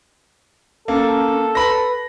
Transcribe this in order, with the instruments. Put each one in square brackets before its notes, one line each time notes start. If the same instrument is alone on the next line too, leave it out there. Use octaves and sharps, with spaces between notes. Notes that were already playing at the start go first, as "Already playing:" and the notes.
[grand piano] A#3 [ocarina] C#4 [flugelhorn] A4
[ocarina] B4 [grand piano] B5 A#6